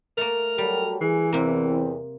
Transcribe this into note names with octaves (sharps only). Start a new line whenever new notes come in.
A3 A#3 A#4
F#3 G3 G4 A4
E3 G#4
E2 C3 A#3 C4